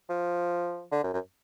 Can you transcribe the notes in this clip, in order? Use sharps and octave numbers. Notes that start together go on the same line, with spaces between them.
F3
D3
F#2
F#2